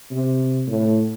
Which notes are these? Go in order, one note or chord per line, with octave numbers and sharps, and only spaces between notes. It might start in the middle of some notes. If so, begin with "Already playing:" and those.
C3
A2